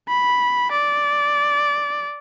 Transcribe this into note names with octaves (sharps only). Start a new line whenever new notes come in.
B5
D5